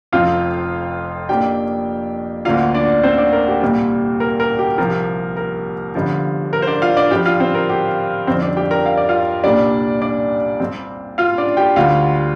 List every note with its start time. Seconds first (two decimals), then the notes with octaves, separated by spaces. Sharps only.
0.12 F1 F2 F3 C4 F4 F5
1.29 F2 F3 A#3 D4 G4 G5
2.45 D2 D3 A#3 D4 F4 F5
2.75 D4 D5
3.03 C4 C5
3.18 D4 D5
3.33 A#4
3.48 G4
3.62 C2 A#2 G3 C4
4.20 A#4
4.40 A#4
4.59 G4
4.78 C2 C3 F3 A#4
5.37 A#4
5.95 G1 G2 D3 F3
6.53 A#4
6.62 C5
6.67 D4 D5
6.82 F4 F5
6.97 D4 D5
7.11 G2 F3 D4 G4 G5
7.26 F4 F5
7.40 C4 C5
7.55 A#4
7.69 G4
8.27 G1 F2 F3 C4 D4 C5
8.42 D4 D5
8.57 G4 G5
8.71 A#4 A#5
8.86 F5
8.97 D5
9.09 F4 F5
9.44 C2 A#2 G3 D4 D5
10.02 D4 D5
10.60 G2 G3 C4
11.18 F4 F5
11.38 D4 D5
11.57 G4 G5
11.76 D2 D3 G3 F4 F5